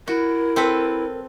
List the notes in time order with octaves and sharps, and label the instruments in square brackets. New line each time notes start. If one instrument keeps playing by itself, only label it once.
[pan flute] E4 [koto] F#4 [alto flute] A#4
[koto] C4 A4 B4